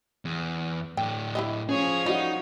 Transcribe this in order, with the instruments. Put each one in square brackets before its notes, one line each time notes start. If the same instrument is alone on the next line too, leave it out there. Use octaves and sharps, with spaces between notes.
[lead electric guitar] E2
[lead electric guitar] A2 D4 [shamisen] G5
[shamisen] E4 G4 D#5
[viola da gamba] F3 C#5 [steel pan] C#4 [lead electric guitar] G#4
[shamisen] G3 [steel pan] A3 F#4 D#5 [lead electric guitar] D#4